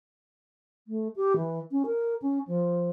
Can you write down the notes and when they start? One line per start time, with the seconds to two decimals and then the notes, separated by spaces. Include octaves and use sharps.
0.88 A3
1.16 G4
1.37 E3
1.71 C#4
1.86 A#4
2.22 C#4
2.47 F3